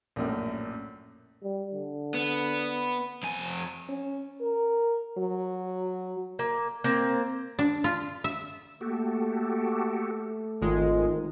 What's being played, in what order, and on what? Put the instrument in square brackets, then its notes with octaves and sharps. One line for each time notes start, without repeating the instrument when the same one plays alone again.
[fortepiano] A#1 F#2 A2
[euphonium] G3
D3
[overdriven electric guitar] B3
F2 G#5
[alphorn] C#4
A#4
F#3
[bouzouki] A#3
A#3 C4
[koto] D4
F4
E5
[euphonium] A3 [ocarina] A#3 [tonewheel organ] F#4 G4 A4
[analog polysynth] G#1 G#3 [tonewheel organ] D#3 [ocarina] F4